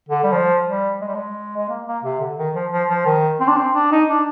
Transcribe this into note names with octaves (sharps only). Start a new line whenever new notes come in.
D3
G3
F3
G3
G#3
G3
G#3
G#3
A#3
A#3
C3
D3
D#3
F3
F3
F3
D#3
C4
D4
C4
D4
D#4
D4